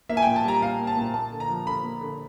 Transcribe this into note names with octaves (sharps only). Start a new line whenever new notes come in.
A#3 E5
G#5
A#2 G5
A5
G3 A#5
A#2 F5
A#3
A5
A#2
A#3 A5
D3
A#5
F3
D3 B5
A#3
D3